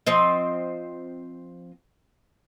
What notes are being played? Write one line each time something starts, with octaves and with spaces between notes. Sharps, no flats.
F3 C4 D#5